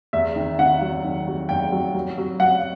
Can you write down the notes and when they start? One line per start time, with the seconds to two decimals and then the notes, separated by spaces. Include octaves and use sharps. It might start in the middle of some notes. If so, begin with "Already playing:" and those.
0.13 E2 E5
0.36 D#3
0.58 D#3 F#5
0.81 F#3
1.04 D#3
1.27 F#3
1.49 E2 G5
1.72 F#3
1.94 F#3
2.18 F#3
2.40 F#3 F#5